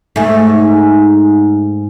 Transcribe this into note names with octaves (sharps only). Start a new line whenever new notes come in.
G#2 A3